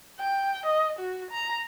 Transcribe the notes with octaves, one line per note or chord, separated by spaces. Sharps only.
G5
D#5
F#4
A#5